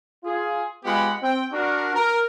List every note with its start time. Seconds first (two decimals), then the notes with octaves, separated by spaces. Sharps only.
0.24 F4 G#4
0.84 G#3 B3 F4 G4 F#5 B5
1.22 C4 G5
1.52 D4 F#4 A#4
1.95 A#4